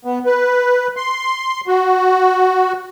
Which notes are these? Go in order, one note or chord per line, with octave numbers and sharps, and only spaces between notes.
B3
B4
C6
F#4